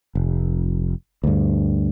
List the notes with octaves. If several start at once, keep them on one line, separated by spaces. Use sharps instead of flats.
F1
D2 G2